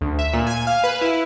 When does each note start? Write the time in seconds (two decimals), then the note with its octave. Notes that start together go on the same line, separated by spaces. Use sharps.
0.01 D2
0.19 E5
0.33 A#2
0.47 G#5
0.67 F5
0.84 B4
1.01 E4